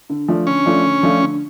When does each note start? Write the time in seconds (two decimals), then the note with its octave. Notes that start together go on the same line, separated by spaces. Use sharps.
0.10 D3
0.28 F3 A3 D4 F4
0.47 D3 C#4
0.66 F3 A3 D4 F4
0.85 D3
1.03 F3 A3 D4 F4
1.22 D3